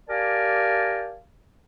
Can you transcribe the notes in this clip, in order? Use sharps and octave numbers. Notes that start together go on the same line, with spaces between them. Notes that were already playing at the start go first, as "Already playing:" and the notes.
G4 A#4 D5 F5 G#5 A5